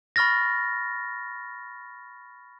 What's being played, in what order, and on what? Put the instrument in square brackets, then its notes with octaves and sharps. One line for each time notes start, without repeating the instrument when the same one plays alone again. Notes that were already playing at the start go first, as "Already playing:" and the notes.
[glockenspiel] B5 C#6 F6 A6 A#6